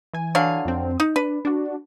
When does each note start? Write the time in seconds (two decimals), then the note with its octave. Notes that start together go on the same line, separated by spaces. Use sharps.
0.13 E3 G#5
0.35 D3 F#3 F5
0.65 F2 C4
1.00 D#4
1.16 D4 B4
1.45 D4 F#4